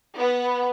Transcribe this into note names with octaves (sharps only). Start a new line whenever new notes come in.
B3